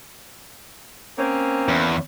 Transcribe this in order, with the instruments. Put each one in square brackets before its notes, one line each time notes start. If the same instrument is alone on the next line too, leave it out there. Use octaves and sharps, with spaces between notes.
[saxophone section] A#3 C4 C#4
[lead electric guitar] E2